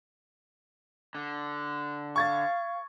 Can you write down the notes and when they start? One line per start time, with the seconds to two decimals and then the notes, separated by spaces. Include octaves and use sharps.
1.15 D3
2.16 F5 C#6 G#6 A6